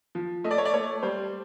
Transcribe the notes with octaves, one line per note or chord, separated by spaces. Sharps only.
F3
A3 D#5
D5
C#5
D5
A3 C#5
G3 C5